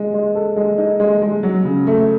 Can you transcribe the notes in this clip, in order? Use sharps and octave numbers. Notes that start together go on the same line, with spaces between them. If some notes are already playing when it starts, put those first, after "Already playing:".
Already playing: G#3
G#3
A4
G#3
D#4
G#3
G#3
F#3
C#3
A3